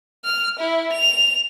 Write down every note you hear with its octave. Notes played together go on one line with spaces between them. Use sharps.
F6
E4
F7